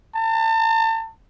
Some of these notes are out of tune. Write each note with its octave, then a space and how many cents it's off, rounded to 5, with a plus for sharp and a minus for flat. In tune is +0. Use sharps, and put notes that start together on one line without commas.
A5 +40